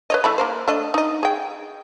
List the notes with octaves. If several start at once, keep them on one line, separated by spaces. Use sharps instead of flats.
B4 C#5 D#5
E3 A3 B5
A#3 A#4 C5
A3 D4 D#5
D#4 D#5
G#4 G5